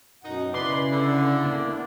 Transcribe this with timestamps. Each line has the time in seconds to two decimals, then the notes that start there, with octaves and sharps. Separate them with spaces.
0.23 F#2 B2 D#4 F#5
0.54 C#3 E4 B4 D5 B5 C6 D6
0.91 D3
1.45 A#3 B3 D4